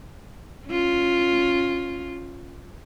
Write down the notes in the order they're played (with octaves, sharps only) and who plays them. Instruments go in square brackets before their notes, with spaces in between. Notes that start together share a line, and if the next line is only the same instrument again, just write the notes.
[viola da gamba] C#4 F4